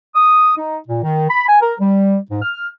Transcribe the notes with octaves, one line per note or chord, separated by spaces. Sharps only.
D#6
D#4
A#2
D#3
B5
G#5
A#4
G3
G#2
F6